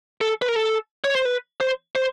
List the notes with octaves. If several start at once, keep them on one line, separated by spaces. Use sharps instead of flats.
A4
B4
A#4
A4
C#5
C5
B4
C5
C5